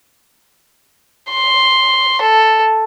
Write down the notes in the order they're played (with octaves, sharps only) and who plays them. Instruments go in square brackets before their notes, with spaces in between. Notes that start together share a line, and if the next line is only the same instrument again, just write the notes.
[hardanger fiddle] C6
A4